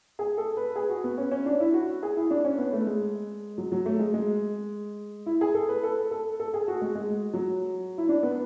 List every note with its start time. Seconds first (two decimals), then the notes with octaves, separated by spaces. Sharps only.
0.19 G#4
0.38 A4
0.57 B4
0.76 G#4
0.90 F#4
1.04 B3
1.18 C#4
1.31 C#4
1.46 D4
1.60 E4
1.74 F#4
2.03 G#4
2.17 E4
2.31 D4
2.45 C#4
2.58 B3
2.73 A3
2.87 G#3
3.58 F#3
3.72 F#3
3.86 A3
3.99 G#3
4.14 G#3
5.26 E4
5.41 G#4
5.54 A4
5.69 B4
5.83 A4
6.11 A4
6.40 A4
6.54 G#4
6.68 F#4
6.81 G#3
6.95 G#3
7.33 F#3
7.98 E4
8.09 D4
8.23 B3